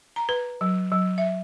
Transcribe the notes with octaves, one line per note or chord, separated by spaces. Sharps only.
A#5
B4
F#3
F#3
E5